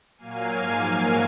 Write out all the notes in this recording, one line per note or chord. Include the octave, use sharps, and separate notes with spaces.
A#2 F#3 A#3 F5 G#5
G#2 F3 A#3
G#2 F#3 A#3